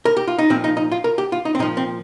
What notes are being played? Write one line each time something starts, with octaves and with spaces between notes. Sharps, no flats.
A#4
G4
F4
D#4
A#2 F3 C4
D#4
D#4
F4
A#4
G4
F4
D#4
C4
A#2 F3 D#4
C4